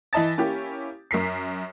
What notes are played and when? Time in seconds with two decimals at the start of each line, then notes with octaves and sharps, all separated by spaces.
0.13 E3 E4 D#5 A5 A6
0.38 A#3 C#4 E4 G4
1.11 F#2 A#4 B6 C7